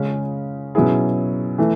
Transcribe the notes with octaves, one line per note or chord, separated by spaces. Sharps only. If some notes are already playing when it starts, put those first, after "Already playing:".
Already playing: C#3 G#3 C#4
B2 F#3 C#4 E4 G#4
E3 A3